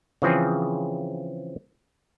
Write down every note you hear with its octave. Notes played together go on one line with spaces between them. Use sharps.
C#3 E3 F3 C4 G#4